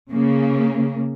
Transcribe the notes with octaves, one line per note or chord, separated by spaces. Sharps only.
C#3 A#3